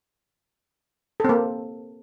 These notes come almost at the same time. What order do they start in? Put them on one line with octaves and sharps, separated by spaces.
A4 C4 A#3